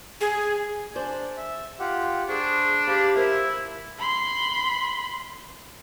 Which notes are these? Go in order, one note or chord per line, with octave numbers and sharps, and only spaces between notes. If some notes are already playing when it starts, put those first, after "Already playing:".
G#4
D4 G#4 C5 D5
E5
F4 G4 F#5
D4 G#4 C5 C6 C#6
G4 C5 F5 A5 B5
E4 F4 A#4 C5 E5
B5 C6